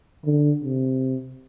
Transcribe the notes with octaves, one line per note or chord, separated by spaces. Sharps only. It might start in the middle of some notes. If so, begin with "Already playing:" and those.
D3
C3